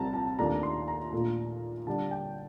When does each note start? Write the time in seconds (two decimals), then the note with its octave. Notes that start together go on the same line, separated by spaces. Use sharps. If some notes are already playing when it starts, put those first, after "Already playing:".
Already playing: C2 C3 G3 C4 A5 A#5
0.13 A5
0.39 D#2 D#3 A3 D4 F4 A#5
0.63 C6
0.88 A#5
1.12 A#2 A3 D4 F4
1.87 D3 G3 D4 A5
2.11 G5